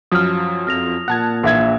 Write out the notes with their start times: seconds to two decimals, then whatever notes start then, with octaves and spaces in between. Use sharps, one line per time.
0.12 F#2 F3 F#3 D#6 F6
0.67 F2 F6 A#6 F7
1.08 A#2 F#5 A5 F#6 G#6
1.43 A#1 E3 E5 G#6